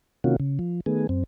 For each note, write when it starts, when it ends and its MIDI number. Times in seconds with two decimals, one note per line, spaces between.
0.24 0.36 48
0.24 0.36 51
0.24 0.36 58
0.24 0.36 61
0.24 0.36 65
0.24 0.36 66
0.40 0.59 49
0.59 0.81 53
0.86 1.07 51
0.86 1.07 57
0.86 1.07 59
0.86 1.07 68
1.09 1.24 42
1.09 1.24 60